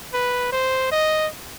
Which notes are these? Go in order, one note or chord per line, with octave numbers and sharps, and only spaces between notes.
B4
C5
D#5